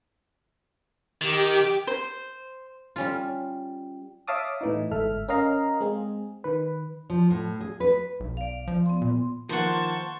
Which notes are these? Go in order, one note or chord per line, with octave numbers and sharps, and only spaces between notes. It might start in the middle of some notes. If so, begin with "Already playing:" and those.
D#3 G4 D6
C5
G3 C#4 F4
C#5 E5 F5 A5 D6 D#6
A2 E3 D#4
G1 G#2 A4 E5 F6
C#4 A#4 D#5 F5 A#5
G#3 C4 G#4
D#3 B4
F3
A2
G#4
B4
B1
D5 F5
F3
B3 C6
A#2
D#3 F3 A#3 C5 F#5 A5 C6 C#6